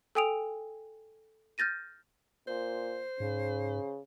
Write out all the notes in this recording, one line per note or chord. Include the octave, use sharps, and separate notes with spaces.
A4 G5 G#5 D#6 D7 F7
F6 G6 A6 A#6 D#7
A#2 C5
G#2 C#3